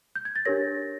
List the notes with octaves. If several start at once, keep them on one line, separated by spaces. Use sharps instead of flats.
G6
G#6
A6
D4 G4 A#4 C#5 A#6